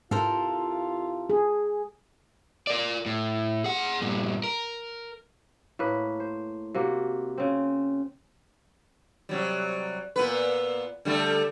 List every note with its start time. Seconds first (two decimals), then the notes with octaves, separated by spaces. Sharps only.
0.11 G#2 C3 E4 F4 A4 A#4 C5
1.30 G#4
2.67 A#4 D5
3.06 A2
3.64 G#4 F#5
4.01 G2 A#2
4.44 A#4
5.79 A2 A#3 B4
6.20 C5
6.75 C3 A#3 F#4
7.38 C#3 C4
9.29 C3 F#3 G3
10.16 A#2 B3 B4
11.05 D3 G3 A3